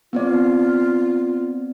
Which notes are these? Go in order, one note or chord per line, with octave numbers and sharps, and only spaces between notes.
B3 C4 F4 D5